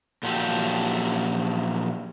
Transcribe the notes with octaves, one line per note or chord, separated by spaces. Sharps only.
A#2 F3 F#3 G4 A4